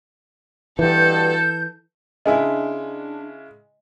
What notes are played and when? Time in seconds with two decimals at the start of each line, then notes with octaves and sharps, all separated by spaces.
0.79 G2 B2 E3 A4 G6
2.26 C#3 G#3 D4 E4 D#5 G#5